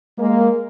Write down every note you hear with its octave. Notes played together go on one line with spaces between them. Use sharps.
G#3 A#3